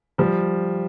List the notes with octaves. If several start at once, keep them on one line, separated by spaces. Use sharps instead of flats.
F3 G3